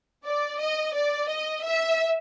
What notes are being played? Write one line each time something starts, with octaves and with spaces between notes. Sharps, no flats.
D5
D#5
D5
D#5
E5